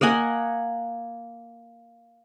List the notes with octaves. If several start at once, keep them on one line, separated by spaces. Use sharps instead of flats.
A#3 D#5 F#5 G#5